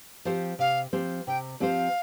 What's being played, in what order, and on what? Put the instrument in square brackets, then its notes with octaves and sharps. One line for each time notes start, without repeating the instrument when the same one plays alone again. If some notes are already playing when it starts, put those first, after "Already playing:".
[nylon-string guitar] F3 C4 G4 C5
[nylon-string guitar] C3 [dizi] F5
[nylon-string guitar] F3 C4 G4 C5
[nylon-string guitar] C3 [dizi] G5
[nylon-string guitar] F3 C4 G4 C5 [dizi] F5